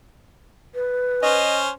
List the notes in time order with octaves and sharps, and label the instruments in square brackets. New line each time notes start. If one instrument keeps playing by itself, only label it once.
[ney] B4
[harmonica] C#4 C5 [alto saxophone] D#5